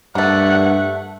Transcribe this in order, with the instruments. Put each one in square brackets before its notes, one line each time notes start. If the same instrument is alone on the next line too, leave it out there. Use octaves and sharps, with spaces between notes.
[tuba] G2 [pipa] A3 A#3 [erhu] F#5